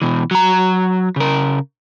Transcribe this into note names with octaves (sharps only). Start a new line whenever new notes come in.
B2 E3
F#3 A#5
C#3 A#4